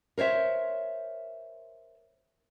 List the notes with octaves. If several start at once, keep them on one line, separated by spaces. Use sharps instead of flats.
A#4 C5 C#5 E5